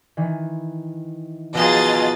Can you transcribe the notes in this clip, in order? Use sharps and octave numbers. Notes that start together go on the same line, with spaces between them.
D#3 E3
B2 F3 F4 G#4 D#5 A#5 A6